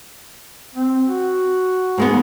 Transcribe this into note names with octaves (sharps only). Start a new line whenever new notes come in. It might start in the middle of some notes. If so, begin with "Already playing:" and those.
C4
F#4
G#2 G#3 B3